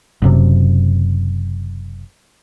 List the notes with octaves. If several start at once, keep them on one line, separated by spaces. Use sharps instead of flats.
F#1 F#2 C3